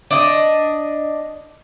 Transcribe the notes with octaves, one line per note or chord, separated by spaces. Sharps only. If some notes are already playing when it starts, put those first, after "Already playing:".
D4 D#5